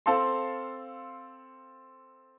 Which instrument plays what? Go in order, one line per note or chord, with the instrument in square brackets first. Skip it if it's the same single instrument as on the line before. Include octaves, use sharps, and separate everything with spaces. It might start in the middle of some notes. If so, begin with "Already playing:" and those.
[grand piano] C4 A4 F5 A5 C6